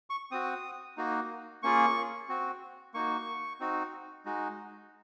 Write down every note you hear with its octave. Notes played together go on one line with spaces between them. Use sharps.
C#6
C4 F#4 D#6
A#3 D#4 F#4
A#3 C#4 F4 G#4 C#6
C4 F#4
A#3 D#4 F#4 C#6
C4 D#4 F#4
G#3 D#4 F#4